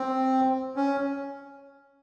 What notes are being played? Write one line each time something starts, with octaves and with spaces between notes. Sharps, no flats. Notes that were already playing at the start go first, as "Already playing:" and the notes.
Already playing: C4
C#4